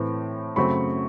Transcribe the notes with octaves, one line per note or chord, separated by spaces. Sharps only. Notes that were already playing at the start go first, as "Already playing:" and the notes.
Already playing: A2 E3 A3 C4
F#2 C#3 F#3 A3 C4 B5 C#6